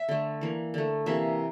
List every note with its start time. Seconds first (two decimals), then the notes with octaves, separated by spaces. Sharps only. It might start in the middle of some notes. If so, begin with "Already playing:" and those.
Already playing: E5
0.09 D3 A3
0.41 E3 A#3
0.74 D3 A3
1.06 C3 E3 A#3 E5